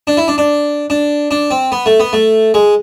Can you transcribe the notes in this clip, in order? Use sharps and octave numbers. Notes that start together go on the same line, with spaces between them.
D4
E4
D4
D4
D4
D4
C4
B3
A3
B3
A3
G#3